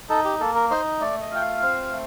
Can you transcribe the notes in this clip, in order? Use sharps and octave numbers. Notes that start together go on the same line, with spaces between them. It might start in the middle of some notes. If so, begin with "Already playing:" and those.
D#4 A4
G4
A#3 A4
A#4
D#4 C5
A3 D5
D#5
F4 G5
F5
C4
A3